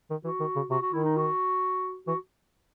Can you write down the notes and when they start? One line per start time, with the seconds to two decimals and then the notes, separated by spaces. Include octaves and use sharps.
0.10 D#3
0.24 E3 F#4
0.40 D#3
0.56 C#3
0.70 C3 F#4
0.82 F#4
0.93 D#3 E4
1.04 D#4
1.16 F#4
2.07 E3 F#4